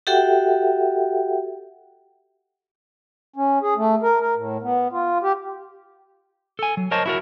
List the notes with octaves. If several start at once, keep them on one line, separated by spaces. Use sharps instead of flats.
F#4 G4 A4 E5 F#5 G5
C#4
G#4
A3
A#4
A#4
A2
B3
F4
G4
A4 G#5
F#3
A#4 C5 C#5 D#5 A5
E4 F#4 A#4